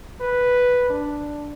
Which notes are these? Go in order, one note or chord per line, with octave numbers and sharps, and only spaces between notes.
B4
D4